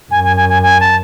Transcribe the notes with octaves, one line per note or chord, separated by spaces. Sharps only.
F#2 G#5
G#5
G#5
G#5
G#5
A5